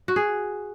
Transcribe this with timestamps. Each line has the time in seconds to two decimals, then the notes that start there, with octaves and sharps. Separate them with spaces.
0.08 F#4
0.16 G#4